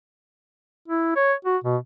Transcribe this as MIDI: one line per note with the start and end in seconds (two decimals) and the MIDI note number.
0.88 1.16 64
1.16 1.34 73
1.45 1.57 66
1.64 1.77 47